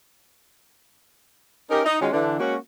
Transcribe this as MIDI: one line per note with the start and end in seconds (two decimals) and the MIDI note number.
1.70 1.80 61
1.70 1.80 63
1.70 1.80 67
1.70 1.80 70
1.85 2.01 63
2.01 2.08 51
2.01 2.08 56
2.01 2.08 61
2.01 2.08 63
2.01 2.08 65
2.01 2.08 66
2.13 2.39 50
2.13 2.39 52
2.13 2.39 62
2.39 2.55 56
2.39 2.55 58
2.39 2.55 61
2.39 2.55 66